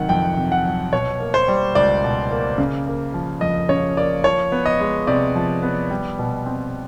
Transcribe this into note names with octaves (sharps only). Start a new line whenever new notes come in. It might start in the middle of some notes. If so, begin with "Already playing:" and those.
Already playing: C3 D#3 F#3 F#5
F2 G5
C3
F#5
F#3
B2 C#5
A#3
C5
G3
C#2 D5
B2
A#3
C#3
A#3
F3
F2 D#5
C#3 C#5
A#3 D5
F3 C#5
B3
D#5
G#3
C3 D5
F3
B3
G3
B2
C4